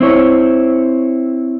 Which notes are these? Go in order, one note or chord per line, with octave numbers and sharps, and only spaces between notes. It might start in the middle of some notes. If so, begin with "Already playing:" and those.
C4 E4 C#5